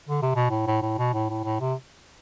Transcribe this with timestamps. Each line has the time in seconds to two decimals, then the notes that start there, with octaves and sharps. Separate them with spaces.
0.09 D3
0.22 C3
0.35 B2
0.50 A2
0.67 A2
0.82 A2
0.98 B2
1.14 A2
1.30 A2
1.44 A2
1.60 C3